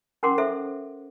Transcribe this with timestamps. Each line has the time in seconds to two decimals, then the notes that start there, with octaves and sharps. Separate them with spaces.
0.23 C#4 A#4 F#5 C6 D6
0.38 A4 C5 E5